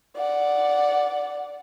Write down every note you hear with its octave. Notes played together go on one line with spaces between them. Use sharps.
D5 F#5